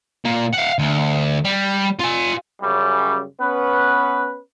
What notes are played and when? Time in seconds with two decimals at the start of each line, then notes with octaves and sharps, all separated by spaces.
0.25 A#2 A#3
0.53 F5 F#5
0.78 D2
1.44 G3
1.99 F4 G#5
2.62 F#2 C#3 G3
3.40 B3 C#4 B4